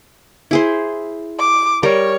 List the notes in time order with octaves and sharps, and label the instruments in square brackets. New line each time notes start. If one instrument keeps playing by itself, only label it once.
[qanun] E4 G#4 C5
[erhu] D6
[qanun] G3 A#4 [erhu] C#5